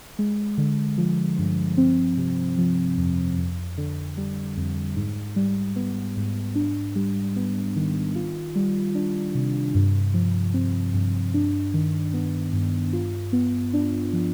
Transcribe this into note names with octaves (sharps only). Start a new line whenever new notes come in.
G#3
D3
F3
G2
C4
C3
F3
F2
F2
D3
G3
F2
G#2
G3
B3
G#2
D4
G3
B3
D#3
F4
G3
D4
C3
G2
F3
C4
G2
D4
D#3
B3
G2
F4
B3
D4
F3